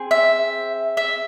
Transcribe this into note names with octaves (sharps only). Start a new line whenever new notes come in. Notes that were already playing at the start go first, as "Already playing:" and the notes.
Already playing: C4 G#4
E5
E5